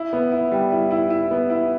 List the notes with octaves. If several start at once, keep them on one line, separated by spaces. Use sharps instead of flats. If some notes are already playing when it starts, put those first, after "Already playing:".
Already playing: E4
B3
E4
G3
E4
E4
E4
B3
E4